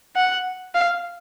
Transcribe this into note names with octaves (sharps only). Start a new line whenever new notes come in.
F#5
F5